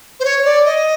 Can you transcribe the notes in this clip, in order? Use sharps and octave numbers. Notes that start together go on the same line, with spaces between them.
C5
C#5
D5
D#5